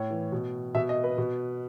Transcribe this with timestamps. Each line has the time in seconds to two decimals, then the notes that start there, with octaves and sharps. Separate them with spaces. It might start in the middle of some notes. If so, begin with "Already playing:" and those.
Already playing: A2 C#5
0.10 E3
0.32 B2
0.75 B2 E5
0.89 D#5
1.04 B4
1.18 B2